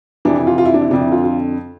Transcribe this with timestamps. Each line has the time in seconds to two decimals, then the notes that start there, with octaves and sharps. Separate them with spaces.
0.25 F2 C3 E3 D4
0.36 E4
0.47 F4
0.58 F4
0.65 E4
0.74 D4
0.82 E4
0.90 F2 D3 D4
1.01 E4
1.12 F4
1.24 F4